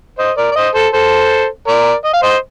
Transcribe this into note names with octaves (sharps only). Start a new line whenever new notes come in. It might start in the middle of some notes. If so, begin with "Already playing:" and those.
C5 D#5
A#4 D5
D5
C5 D#5
A4 C5
A4 C5
A#4 D5
D#5
F5
C5 D#5